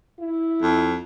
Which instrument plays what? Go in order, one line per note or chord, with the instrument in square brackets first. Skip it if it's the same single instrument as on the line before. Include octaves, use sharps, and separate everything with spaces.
[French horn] E4
[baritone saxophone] F2